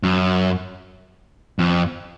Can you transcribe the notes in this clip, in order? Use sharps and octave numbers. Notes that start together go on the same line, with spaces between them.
F#2
F2